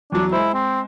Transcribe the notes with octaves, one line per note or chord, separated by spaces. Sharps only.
E2 F#3 D4
G#3 E4 C5
C4